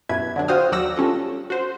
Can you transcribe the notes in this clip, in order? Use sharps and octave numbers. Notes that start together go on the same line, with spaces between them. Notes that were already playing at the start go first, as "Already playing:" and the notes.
F#2 B2 G3 E4 B4 G#6
D3 F#3 D4
F4 F#4 C5 G5 D#6 F6
D#2 F#3 D5 F#5 E6 A#6
G3 C#4 F4 A4
F#4 C5